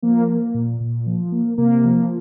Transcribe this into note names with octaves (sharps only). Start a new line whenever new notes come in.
F3 A#3
A#3
A#2
A#2
F3
A#3
C3 A#3
F3